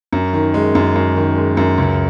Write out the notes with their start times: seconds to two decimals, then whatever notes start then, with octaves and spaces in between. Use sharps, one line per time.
0.13 F#2
0.33 D#3
0.54 G#3
0.75 F#2
0.96 F#2
1.16 D#3
1.36 G#3
1.57 F#2
1.78 C#2